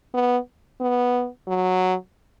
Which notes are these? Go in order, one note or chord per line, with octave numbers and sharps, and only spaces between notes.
B3
B3
F#3